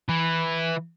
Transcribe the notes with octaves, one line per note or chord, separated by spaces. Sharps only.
E3 E4